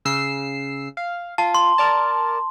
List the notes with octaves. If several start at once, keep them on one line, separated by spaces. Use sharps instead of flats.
C#3 E6 C7
F5
F4 A5
C6
A#4 D5 A5